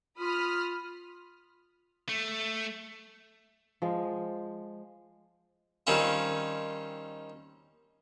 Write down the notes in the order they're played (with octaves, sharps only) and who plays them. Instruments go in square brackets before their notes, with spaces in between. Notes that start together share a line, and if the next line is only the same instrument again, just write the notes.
[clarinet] F4 [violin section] B5 D#6 F6
[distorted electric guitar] A3
[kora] F3 G#3
[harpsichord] D#3 G3 C4 C#4 F4